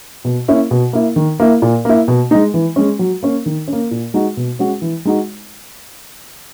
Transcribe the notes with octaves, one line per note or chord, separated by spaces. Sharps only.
B2
A#3 C#4 E4
B2
A#3 E4
D#3
A#3 E4
A#2
A#3 E4
B2
G#3 D#4
E3
G#3 C#4
F#3
A#3 C#4
D#3
C#4
A#3
A#2
G#3 D#4 F#4
B2
G#3 C#4 F#4
E3
G#3 D#4 F#4